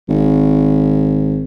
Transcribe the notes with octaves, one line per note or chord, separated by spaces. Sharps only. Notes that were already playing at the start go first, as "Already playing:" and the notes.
G#1